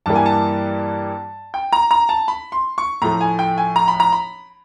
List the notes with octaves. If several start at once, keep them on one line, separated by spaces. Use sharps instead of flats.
G2 E3 G3 A#3 A5
G#5
A5
G5
A#5
A#5
A5
B5
C6
C#6
A2 F3 A3 A#5
G#5
G5
G#5
A#5
B5
A#5
B5